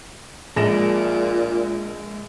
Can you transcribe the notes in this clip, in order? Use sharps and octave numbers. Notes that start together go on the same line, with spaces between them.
A#1 A#2 G#3 A#6 E7